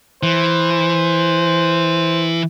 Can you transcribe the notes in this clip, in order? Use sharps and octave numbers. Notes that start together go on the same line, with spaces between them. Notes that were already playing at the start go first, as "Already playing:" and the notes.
E3 C5